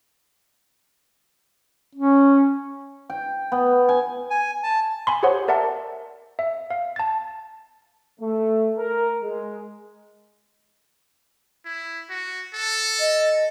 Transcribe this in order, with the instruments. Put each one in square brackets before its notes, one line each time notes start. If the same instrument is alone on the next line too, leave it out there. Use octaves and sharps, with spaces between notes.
[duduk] C#4
[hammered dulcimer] G5
B3
G#5
[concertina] G#5
A5
[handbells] G#5 B5 C6
G4 G#4 C5 C#5 F#5 C6
A#4 D5 E5 F#5 A5
E5
F5
A5 A6
[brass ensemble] A3
A#4
G#3
[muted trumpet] E4
F#4
A4
[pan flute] D#5